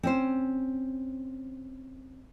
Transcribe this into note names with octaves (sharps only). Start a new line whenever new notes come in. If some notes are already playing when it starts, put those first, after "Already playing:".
C4 C#4 C5